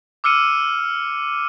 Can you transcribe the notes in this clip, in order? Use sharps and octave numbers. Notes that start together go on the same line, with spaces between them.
D6 E6 F6 C#7 D#7